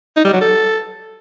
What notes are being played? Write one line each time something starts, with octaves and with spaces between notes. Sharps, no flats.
D#4
G3
F#3
A4